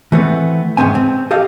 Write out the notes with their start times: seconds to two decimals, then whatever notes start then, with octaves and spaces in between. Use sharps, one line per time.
0.12 E3 A3 B3 C4
0.77 E2 G#2 C#3 B3 C4 G#5
0.95 C4
1.31 G4 A4 D#5 F5